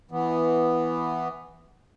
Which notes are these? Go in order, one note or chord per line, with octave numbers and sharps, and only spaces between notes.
E3 B3